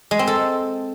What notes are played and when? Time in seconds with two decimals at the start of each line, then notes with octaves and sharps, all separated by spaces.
0.11 G#3
0.19 C4
0.27 A4